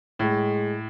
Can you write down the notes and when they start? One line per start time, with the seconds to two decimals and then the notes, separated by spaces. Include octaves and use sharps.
0.19 A2 G#3